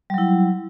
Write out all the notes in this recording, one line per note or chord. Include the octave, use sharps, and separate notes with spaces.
F#3 G3 E4